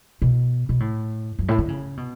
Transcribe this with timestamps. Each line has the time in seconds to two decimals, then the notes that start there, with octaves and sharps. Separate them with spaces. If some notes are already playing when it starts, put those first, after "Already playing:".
0.22 B2
0.69 B2
0.80 A2
1.39 F#2
1.48 A2
1.58 D3
1.68 C#3
1.97 B2